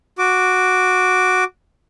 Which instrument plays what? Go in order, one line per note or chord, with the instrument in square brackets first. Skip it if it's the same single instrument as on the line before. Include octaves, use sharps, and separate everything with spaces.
[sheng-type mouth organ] F#4 D6